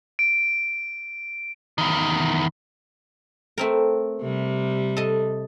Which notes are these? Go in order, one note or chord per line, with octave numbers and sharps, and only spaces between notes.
D7
E2 D#3
A3 C4 A#4
C3 G3
A4 D#5